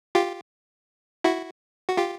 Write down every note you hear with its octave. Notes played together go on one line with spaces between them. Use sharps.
F4 G4
E4 F#4
F#4
F4 G4